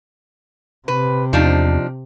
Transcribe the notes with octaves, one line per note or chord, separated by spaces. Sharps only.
C3 B4
E2 F3 D4 D#4